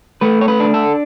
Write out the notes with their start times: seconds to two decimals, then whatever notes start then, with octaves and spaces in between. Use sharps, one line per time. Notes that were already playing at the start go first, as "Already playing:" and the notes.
0.21 A3 B4
0.41 C#5
0.48 B4
0.60 D4
0.74 A4